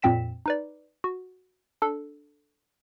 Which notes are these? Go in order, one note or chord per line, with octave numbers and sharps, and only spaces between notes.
F2 A#2 C4 G5 B6 E7
D#4 B4 D5
F#4
D4 A4